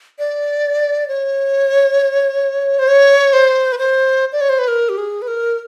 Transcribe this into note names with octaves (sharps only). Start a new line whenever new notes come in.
D5
C#5
C5
C#5
C5
B4
C5
D5
C#5
C5
B4
A#4
G4
G#4
B4
A#4